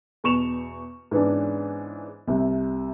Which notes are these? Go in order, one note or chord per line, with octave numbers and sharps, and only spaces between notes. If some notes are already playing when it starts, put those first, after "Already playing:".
E2 B2 C#6 E7 F7
G#2 E3 B3 C#4 D4
C2 C3